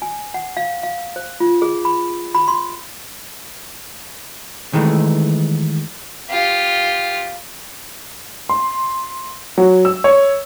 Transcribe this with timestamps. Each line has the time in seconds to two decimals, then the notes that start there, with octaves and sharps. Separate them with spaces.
0.02 G#5
0.34 F#5
0.57 F5
0.83 F5
1.16 C5
1.40 F4
1.62 G#4
1.85 B5
2.35 B5
2.48 C6
4.73 D#3 E3 G#3 A3
6.30 F4 G4
8.49 C6
9.58 F#3
9.85 E6
10.04 C#5